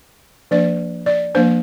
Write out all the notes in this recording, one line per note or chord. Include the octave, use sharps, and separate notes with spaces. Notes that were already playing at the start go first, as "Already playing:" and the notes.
F3 A#3 D4 D5
D5
F3 A#3 D4 C5